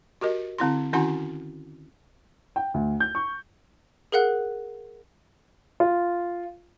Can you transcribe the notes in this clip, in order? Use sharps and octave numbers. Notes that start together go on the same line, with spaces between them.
F#4 G4 A#4 D#5
D3 C4 E4 C6
D#3 C#4 E4 F#4 F#5 C6
G5
D2
G6
C#6
G#4 A#4 F5 F#5 F#6
F4